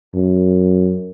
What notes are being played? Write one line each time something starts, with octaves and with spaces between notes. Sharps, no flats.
F#2